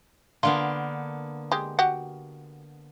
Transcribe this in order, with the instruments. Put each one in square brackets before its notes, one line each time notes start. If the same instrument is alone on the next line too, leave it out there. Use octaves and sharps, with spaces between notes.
[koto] D3 A#3 B3 [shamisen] F4
[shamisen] G#3 G4
F#4 G4 F#5